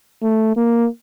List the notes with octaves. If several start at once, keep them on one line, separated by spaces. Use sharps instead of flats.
A3
A#3